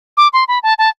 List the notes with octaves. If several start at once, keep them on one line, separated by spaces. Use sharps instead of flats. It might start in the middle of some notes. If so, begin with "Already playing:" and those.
D6
C6
B5
A5
A5